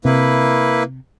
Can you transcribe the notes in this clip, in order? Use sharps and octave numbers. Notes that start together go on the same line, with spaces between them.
C3 A#3 E4 B4